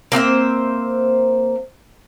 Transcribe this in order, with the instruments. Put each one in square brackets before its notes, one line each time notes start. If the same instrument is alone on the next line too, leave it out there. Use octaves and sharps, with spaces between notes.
[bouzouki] A#3 C4 C5 E5